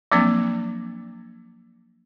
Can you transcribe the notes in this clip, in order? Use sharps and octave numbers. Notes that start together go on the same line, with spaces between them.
F3 F#3 A#3 C4 D4